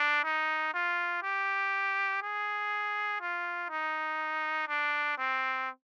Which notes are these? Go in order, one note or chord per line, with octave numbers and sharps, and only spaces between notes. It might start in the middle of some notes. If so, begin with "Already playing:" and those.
Already playing: D4
D#4
F4
G4
G#4
F4
D#4
D4
C4